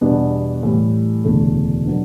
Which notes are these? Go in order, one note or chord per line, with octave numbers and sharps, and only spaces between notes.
E2 B2 G3 B3 D4
A2 E3 G3
E1 D2 C#3 E3 A3
B2 F#3 B3 D4